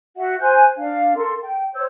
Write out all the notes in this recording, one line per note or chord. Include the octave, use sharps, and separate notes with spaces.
F#4 E5 F#5
C5 G#5 F#6 G6
D4 F5
A4 A#4 C6
G5
C5 C#5 E6 G6